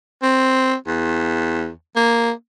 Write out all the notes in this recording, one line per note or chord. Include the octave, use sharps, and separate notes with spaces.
C4
E2
A#3